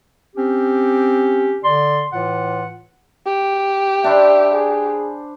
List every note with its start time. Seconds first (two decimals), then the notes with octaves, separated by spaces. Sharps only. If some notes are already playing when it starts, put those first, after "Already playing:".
0.36 C4 C#4 G4
1.63 D3 D5 C6
2.12 A2 E3 F4 F#5
3.26 G4
4.04 D4 C5 E5 B5
4.52 G#4